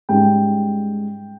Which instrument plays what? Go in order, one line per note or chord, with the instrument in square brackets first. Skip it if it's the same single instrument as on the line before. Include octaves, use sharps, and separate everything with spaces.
[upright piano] G#2 G3 C#4 G5